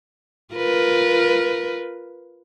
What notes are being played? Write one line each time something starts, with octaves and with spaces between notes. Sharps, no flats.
F4 A#4 B4